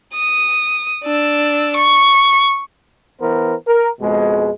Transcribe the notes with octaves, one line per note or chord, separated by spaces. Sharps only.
D#6
D4 E6
C#6
E3 B3 A#4 C5
A#4
F2 B2 G#3